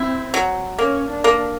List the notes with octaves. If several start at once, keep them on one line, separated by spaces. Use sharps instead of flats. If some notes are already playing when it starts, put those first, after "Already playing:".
Already playing: C4 E4
F#3
A#3 C#4
D4
A#3